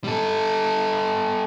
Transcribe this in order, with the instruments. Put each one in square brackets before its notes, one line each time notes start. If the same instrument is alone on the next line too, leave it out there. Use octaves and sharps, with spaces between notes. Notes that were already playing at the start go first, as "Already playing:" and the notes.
[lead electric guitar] G3 A4